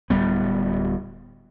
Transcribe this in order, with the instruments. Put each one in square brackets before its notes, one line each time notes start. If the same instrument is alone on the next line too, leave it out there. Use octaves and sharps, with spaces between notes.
[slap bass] D1 G3 B3